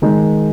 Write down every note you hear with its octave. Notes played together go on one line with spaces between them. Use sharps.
D#3 G#3 D#4